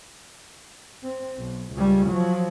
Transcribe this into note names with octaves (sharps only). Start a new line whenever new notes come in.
C4
B1
C#2 G3
F3 F#3